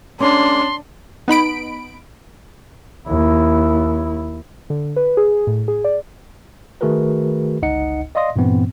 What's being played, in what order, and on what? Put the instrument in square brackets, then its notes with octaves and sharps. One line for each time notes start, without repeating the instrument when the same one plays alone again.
[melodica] G#3 A#3 [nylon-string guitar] C#4 [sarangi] D4 [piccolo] C6
[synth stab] B3 D#4 B5 D7
[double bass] D#2 E4
[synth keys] D3
B4
G#4
A2
G#4
D5
[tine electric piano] D#3 A3 F#4 G#4 A#4 B4
G1 C#2 D#4 D#5 F#5 C#7
D5 D#5 F5 C6 D#6 A#6
G2 A#2 E3 B3 C4